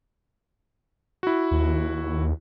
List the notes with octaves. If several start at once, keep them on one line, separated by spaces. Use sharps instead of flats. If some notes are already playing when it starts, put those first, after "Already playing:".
E4 F#4
D#2